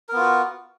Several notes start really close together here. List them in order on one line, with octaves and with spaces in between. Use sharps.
A#4 B3 F4 F#4